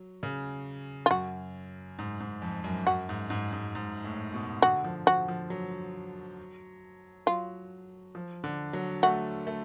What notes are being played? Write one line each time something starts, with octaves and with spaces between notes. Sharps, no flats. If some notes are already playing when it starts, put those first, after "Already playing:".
Already playing: F#3
C#3
F4
F#2 F#4
G#2
G#2
F2
F#2
F#2 F#4
G#2
G#2
G#2
G#2
A2
B2
D3 F#4
F3
F3 F#4
F3
F#3
F#3 F4
F3
D3
F#3
A3 F#4
A3